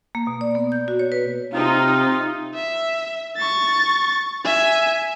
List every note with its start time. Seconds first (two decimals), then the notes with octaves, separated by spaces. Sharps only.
0.15 A#3
0.27 B2
0.41 D5
0.55 B3
0.72 G6
0.88 F#4
0.99 C#5
1.12 B4
1.53 C3 C4 D#4 F4
2.55 E5
3.37 C#6 A6
4.45 E5 G#5